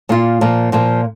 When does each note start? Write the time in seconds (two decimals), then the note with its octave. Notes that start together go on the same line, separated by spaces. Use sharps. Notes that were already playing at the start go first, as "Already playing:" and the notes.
0.09 A#2 A#3 F4
0.41 A#2 F3 A#3
0.72 A#2 F3 A#3